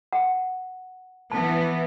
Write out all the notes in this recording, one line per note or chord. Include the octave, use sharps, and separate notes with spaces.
F#5
E3 B3 A5